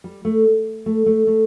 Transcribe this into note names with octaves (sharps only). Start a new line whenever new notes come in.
G3
A3
A3
A3
A3